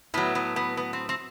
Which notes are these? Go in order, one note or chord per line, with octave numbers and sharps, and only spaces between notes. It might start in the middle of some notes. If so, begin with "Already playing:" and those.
A2 F#3 B3
B3
B3
B3
C4
C4